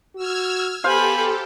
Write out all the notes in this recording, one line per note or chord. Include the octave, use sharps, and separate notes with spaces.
F#4 E6 F6 G#6
B3 G4 A4 C5 F5 G#5 B5